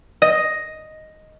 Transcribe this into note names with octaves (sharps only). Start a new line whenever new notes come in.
D#5